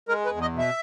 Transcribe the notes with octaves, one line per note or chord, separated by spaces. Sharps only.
G#3 A#4
B4
E2
D#5
B2
E5